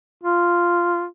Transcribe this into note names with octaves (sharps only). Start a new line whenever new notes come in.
F4